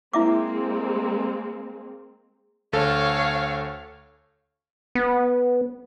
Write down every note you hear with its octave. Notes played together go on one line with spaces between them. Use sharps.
G#3 A#3 C4 E4 E5 D6
D2 A4 C#5 F5
B3